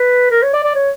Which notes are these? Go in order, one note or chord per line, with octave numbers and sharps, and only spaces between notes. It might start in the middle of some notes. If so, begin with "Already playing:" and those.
Already playing: B4
A#4
C#5
D5
D5
C#5